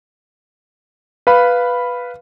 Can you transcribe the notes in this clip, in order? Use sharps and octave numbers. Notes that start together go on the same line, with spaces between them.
B4 F5 B5